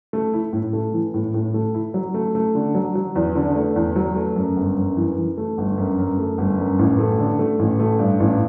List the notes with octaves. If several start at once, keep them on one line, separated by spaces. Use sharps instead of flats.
A3
E4
A2
A3
E3
A2
A2
A3
E4
F#3
A3
A3
D3
F#3
F#3
E2
D3
A3
E2
F#3
A3
F#2
G1
F#2
E3
E3
A3
G1
F#2
F#2
A3
G1
F#2
A1
A3
D3
A3
A1
A3
G2
A1